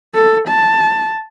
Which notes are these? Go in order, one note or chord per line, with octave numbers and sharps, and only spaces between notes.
A4
A5